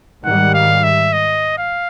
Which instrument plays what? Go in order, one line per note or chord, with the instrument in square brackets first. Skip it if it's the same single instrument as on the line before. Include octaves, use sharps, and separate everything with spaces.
[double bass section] G#2 D#3 G3 [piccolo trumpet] F#5
[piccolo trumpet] F5
E5
D#5
F5